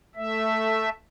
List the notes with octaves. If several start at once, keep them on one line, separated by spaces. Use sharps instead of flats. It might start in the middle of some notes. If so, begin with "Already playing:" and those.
A3 E5